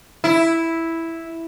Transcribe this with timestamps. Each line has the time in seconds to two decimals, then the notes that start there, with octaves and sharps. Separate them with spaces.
0.24 E4